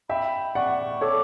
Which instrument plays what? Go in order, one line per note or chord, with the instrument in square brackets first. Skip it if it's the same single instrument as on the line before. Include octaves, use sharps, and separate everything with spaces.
[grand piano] E5 G5 [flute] B5
[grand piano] D5 F#5 [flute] C#6
[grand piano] A4 C#5 [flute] D6